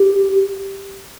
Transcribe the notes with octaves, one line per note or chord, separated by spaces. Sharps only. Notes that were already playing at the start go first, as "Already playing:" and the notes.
Already playing: G4